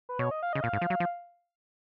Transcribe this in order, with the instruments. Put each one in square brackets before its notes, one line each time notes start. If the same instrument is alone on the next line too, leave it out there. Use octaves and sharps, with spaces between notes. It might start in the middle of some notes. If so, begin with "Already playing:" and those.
[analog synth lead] B4
[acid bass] B2 [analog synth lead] C#5
[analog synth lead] D#5
F5
[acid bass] C#3 [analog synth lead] D#5
[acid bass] A#2 [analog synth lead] F5
[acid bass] G#2
F3
F#3
F3